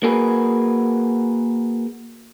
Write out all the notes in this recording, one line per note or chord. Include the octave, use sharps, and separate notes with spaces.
A#3 F#4 G#4 B4